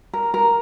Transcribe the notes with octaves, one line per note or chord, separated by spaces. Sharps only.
A#4
A#4